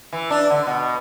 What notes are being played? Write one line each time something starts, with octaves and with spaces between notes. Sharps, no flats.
E3
D4
D3
B2